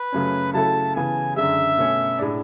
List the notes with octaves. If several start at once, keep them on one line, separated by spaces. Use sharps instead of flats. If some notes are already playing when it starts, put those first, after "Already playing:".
Already playing: B4
F#2 C#3 F#3 A3 C#4
C#3 F#3 A3 E4 A4 A5
C#3 E3 B3 G#5
F#2 D3 G#3 E5
B2 A3 C#4
A2 G#3 D4